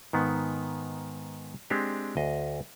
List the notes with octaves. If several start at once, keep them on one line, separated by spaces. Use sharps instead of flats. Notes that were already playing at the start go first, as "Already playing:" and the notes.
G#2 D#3 B3
G#3 C4 D4 G4
D2 D#5